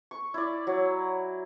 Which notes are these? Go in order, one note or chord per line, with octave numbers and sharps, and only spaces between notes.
C#6
E4 D5
F#3